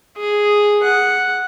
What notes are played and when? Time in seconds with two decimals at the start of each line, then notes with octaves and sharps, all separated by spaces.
0.17 G#4
0.83 F#5